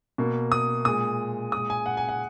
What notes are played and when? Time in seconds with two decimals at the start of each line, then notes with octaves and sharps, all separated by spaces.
0.18 B2 A#3
0.52 D#6
0.85 A#2 G#3 D#6
1.52 A#2 G#3 D#6
1.70 G#5
1.86 F#5
1.97 G#5
2.09 F#5